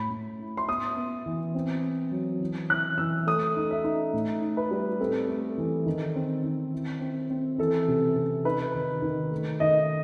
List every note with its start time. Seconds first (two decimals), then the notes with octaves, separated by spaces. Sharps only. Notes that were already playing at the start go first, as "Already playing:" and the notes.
Already playing: A2 B5
0.10 A2
0.39 E4
0.57 C6
0.69 B3 D#6
0.96 B3
1.26 E3
1.55 C4
1.83 C4
2.11 F#3
2.40 E3
2.70 E3 F#6
2.98 E3 E6
3.27 A3 D#6
3.57 D#4
3.71 E5
3.84 D#4
4.13 A2
4.42 D#4
4.57 B4
4.71 G3
5.00 C4 A4
5.29 A3
5.58 E3
5.86 D#3
6.16 C4
6.44 D#3
6.73 E4
7.01 C4
7.30 C4
7.58 E3 A4
7.88 C3
8.16 C3
8.45 D#4 B4
8.75 D#3
9.02 D#3
9.31 A3
9.60 D#3 D#5